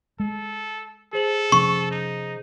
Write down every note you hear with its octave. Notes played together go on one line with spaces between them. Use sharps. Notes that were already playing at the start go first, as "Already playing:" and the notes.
G#3 A4
G#4 A4 C5 F#7
C3 F3 C#4 C#6
D#4